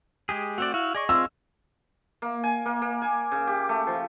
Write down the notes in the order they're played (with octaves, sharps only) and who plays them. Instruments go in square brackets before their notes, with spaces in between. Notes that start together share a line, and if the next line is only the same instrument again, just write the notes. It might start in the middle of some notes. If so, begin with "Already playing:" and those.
[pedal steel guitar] G#3 G4 G#4
[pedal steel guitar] A3 C4 D5 [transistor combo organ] F#4
[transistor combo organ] E4 F5 [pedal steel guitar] F#4
[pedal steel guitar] G#4 D#5 C#6 [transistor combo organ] D5
[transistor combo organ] C4 F4 [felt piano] E6
[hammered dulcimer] A#3
G#5
A#3
A#3
G#5
C#3
G4
A3
F3